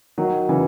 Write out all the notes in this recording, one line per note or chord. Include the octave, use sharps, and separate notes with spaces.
D#3 F#3
C#3 E3